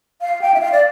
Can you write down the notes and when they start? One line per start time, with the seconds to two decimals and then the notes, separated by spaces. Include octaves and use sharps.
0.21 F5
0.42 G5
0.54 E5
0.60 F5
0.72 D5